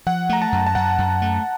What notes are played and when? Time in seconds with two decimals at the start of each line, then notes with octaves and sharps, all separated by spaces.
0.06 F3 F#5
0.29 A3 A#5
0.42 A5
0.52 F#2
0.67 A5
0.75 F#2 F#5
0.98 F#2
1.22 A3